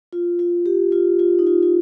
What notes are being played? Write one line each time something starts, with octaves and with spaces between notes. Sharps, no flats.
F4
F4
G4
F4
F4
D#4
F4
F4